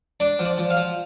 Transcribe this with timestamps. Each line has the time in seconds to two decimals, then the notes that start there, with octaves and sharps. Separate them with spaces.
0.20 D4 D5
0.39 F3
0.45 D5
0.58 F3
0.70 F5
0.77 F3